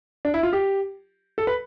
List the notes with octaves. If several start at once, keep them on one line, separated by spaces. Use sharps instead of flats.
D4
E4
F4
G4
A4
B4